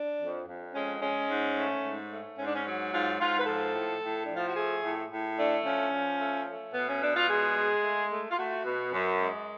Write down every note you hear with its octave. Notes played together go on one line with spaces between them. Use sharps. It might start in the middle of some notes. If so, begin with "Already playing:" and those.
Already playing: D4
F2
F2
G#3 C#4
G#3 C#4
G#2
A3
G#2
A3
G#2 C#4
D4
C#4
F#3
G#2 F4
G#2 F4
B4
F3 A4
A2
A2
F3 D4
F4
F#4
A3 G#4
A2
A2
A3 D4
F3 C#4
F3
A3
A3
B2 B3
C#4
B2 D4
F4
G#3 G#4
G#3
A3
A3
F4
A3 F#4
B2
F#2
G#3